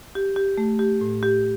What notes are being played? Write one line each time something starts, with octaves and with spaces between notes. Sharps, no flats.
G4
G4
A3
G4
A2
G4